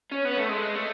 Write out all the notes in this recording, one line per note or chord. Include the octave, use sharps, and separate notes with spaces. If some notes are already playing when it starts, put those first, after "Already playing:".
C#4
B3
A3
G#3
A3